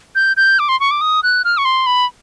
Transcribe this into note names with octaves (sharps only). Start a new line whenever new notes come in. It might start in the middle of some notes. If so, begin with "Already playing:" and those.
G6
G6
D6
C6
C#6
D6
D#6
F#6
F6
C#6
C6
B5